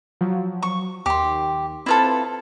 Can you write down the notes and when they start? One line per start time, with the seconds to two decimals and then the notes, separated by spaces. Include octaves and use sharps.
0.21 F3 F#3
0.62 C#6
1.06 D#2 G4 C6
1.86 C4 E4 F4 A4 B4